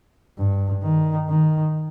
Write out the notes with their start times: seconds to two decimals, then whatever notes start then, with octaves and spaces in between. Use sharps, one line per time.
0.39 G2
0.83 D#3
1.29 D#3